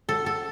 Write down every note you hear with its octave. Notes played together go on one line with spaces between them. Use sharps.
A4
A4